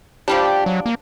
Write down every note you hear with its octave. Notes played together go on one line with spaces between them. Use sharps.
F3 G3 D4 G4
F#3
A#3